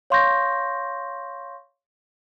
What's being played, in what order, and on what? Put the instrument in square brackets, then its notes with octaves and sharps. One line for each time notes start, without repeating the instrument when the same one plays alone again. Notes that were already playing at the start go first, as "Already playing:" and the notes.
[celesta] C#5 F5 C6 C#6 G6 A#6